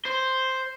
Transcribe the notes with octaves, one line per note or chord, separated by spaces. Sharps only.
C5